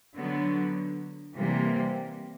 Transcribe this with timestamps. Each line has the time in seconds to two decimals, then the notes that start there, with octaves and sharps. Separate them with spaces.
0.16 D3 F#3 B3
1.35 C3 E3 G3 A#3